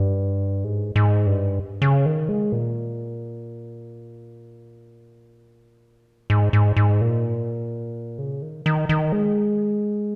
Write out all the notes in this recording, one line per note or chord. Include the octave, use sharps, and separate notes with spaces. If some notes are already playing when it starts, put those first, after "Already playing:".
Already playing: G2
G#2
G#2
G2
C#3
D#3
G#3
A#2
G#2
G#2
G#2
A#2
C#3
D#3
D#3
D#3
G#3